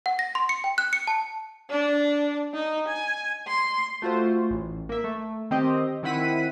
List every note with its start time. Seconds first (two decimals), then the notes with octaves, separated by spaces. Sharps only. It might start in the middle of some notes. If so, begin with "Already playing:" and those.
0.06 F#5
0.19 A#6
0.35 C6
0.49 C#7
0.64 G5
0.78 F#6
0.93 C#7
1.07 A5
1.70 D4
2.54 D#4
2.88 G#5
3.47 C6
4.02 A3 F4 F#4 C5
4.50 A1
4.89 A#3 E5
5.04 A3
5.51 D#3 C4 G4 D#5
6.03 D#3 C4 E4 F#5 B6 D#7